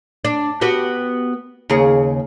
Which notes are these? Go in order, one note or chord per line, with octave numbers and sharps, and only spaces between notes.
D4
B3 F#4 G4
D#2 C#3 G#4